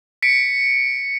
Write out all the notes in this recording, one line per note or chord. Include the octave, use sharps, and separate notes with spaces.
B6 C#7 D7